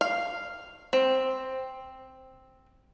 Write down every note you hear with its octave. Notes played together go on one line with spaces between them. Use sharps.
F5
C4